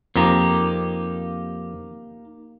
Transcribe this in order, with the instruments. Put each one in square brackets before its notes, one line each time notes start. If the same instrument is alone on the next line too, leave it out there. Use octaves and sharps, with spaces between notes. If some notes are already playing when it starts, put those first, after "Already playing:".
[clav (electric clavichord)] F2 A#5 [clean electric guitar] A#3 D#4 G4